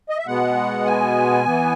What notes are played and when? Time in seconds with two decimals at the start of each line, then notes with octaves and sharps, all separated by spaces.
0.09 D#5
0.18 E5
0.27 B2 G#3 B3 F#5
0.86 G#5
1.45 E3 B3